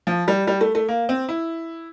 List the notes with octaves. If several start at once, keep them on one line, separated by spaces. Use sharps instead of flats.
F3
G3
G3
A3
A3
A#3
C4
E4